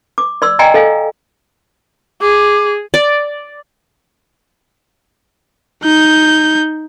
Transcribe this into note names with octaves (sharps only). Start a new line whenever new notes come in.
D6
D5 C6 E6
D5 D#5 G5 G#5 A#5 C6
A4 D#5 F5 G#5
G#4 D6
D5
D#4 G6